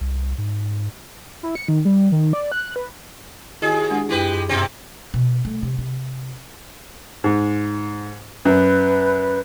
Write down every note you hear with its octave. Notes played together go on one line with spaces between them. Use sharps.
C2
G#2
E4
C#7
D#3
G3
D#3
D5
F#6
B4
D#2 E4 F#4 G#4 D#5
G#3 D4 F#5
F#2 G#3 E4 G4 B4
F#2
G2 B2 C4
B2
A3
C3
C3
G#2
F#2 B4